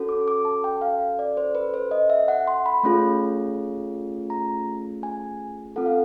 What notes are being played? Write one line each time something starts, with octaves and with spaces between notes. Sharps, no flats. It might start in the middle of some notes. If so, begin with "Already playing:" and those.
Already playing: C#4 F#4 A4
D6
D6
A5
G5
F5
D5
C5
B4
C5
D#5
E5
F#5
C6
B5
A3 C#4 F4 G#4
A#5
G#5
C4 F4 A4 F#5
F5